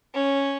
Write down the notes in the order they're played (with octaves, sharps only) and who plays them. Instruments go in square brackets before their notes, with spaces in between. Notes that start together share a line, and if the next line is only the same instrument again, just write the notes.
[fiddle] C#4